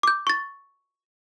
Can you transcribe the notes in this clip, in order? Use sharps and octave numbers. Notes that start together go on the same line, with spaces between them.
D6 G6
C#6 A6